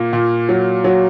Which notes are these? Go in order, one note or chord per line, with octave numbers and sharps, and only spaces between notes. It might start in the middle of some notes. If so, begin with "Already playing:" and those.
Already playing: A#2 A#3
A#2
F#3
F#3